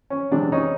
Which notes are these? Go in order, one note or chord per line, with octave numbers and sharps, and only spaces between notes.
C#4
C3 E3 G#3 B3 D4
C#4 D#4